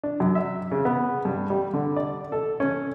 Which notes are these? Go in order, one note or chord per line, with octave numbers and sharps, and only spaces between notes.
D4
F#2
E5
C#3
B3
G2
G3
D3
D5
A4
C#4